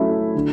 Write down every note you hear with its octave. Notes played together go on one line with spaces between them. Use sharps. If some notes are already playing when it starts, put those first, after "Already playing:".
Already playing: F#3 A3 C#4 E4
D3